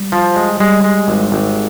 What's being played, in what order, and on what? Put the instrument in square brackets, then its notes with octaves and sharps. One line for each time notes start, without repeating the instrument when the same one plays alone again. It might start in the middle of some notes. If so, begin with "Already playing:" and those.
Already playing: [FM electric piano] G3
[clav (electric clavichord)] F3
G#3
[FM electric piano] G3 [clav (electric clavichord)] G#3
[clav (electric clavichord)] G#3
G#1
G#1